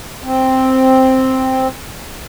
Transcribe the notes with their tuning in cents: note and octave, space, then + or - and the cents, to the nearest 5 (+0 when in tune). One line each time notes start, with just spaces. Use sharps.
C4 +0